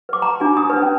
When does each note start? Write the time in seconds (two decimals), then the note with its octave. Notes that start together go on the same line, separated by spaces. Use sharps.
0.09 B4 D6
0.22 A#5
0.40 D4 F4 F#4 G#5
0.57 D#6
0.70 D4 B4
0.82 C#4